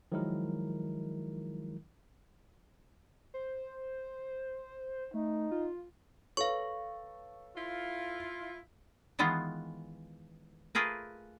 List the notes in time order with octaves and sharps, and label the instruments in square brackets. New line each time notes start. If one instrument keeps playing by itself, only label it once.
[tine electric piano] D#3 F3 F#3 G#3 E4 A#4
[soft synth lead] C5
[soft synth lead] A3 [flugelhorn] D#4
[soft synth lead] F4
[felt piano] A4 B4 C#5 [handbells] F5 C#6
[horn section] E4 F4
[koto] D#3 E3 G#3 B3 F4
A3 F4 G#4 A#4 B4